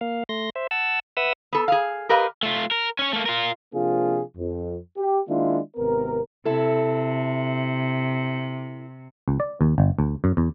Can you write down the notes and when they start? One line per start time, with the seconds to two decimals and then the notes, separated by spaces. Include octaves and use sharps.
0.01 A#3 F5
0.29 A3 C6 A#6
0.56 C5 E5
0.71 F#5 A5 E6
1.17 B4 E5 F#5 D#6 E6
1.53 B3 A4
1.68 G#4 F5
2.09 G4 A#4 B4 D#5 F5
2.43 A3 F4
2.71 A#4
2.99 C#4 C#5
3.13 A3 A#3
3.26 F4 A#4
3.73 C3 F3 A#3 D4 F4 G#4
4.37 F2
4.97 G4
5.29 D#3 G#3 A#3 D4 E4 F4
5.77 G#1 C3 B3 A#4
6.45 C3 E4 A4
9.28 C#2
9.40 D5
9.61 D#2
9.78 G1
9.99 D2
10.24 F#2
10.37 E2